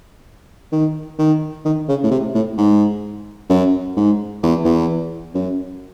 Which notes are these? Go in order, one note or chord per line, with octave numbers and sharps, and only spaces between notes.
D#3
D#3
D#3
C#3
A2
C3
A2
G#2
F#2
G#2
E2
E2
F#2